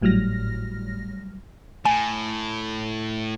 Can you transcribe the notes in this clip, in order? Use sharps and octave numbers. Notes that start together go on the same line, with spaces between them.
G#1 A2 F#3 G3 F6 A#6
A2 G#5